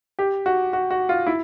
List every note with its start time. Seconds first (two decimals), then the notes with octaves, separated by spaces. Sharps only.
0.19 G4
0.46 F#4
0.73 F#4
0.91 F#4
1.09 F4
1.27 E4